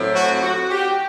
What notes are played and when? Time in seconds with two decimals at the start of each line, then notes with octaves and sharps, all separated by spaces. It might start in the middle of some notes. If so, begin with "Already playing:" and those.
Already playing: A2 F#3 C4
0.14 F#4
0.42 F#4
0.70 G4